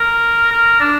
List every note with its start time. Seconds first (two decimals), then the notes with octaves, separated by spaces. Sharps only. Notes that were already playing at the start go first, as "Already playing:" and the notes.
Already playing: A#4
0.51 A#4
0.80 D4